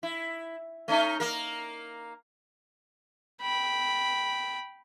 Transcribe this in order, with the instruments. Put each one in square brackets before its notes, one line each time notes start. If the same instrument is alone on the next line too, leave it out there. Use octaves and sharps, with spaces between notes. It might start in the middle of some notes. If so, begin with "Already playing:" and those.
[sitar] E4
A3 C#4 D#4
A#3 A#4
[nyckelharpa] G5 B5